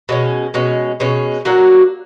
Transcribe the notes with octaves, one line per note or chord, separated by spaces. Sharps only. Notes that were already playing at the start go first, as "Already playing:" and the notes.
B2 G#3 C#4
B2 G#3 C#4
B2 G#3 C#4
F#3 A#3 D4 F#4